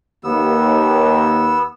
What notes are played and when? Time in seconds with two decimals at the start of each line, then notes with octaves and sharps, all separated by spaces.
0.24 D#2 B3 E6